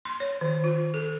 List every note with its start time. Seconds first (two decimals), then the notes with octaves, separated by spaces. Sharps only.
0.05 C6
0.20 C#5
0.41 D#3
0.64 F4
0.94 A4